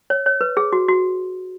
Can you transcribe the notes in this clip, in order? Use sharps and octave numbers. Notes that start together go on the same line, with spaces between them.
C#5
C#5
B4
G#4
F#4
F#4